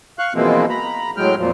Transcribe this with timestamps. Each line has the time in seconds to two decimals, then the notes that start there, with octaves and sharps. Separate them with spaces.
0.19 F5 C#6 F#6
0.35 B2 E3 F3 G#3 A#3 C4
0.70 A#5 B5
1.17 A2 F#3 G#3 G5 F6
1.38 F2 A#2 F3